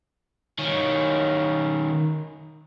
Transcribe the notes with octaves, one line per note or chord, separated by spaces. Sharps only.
D#3 C#4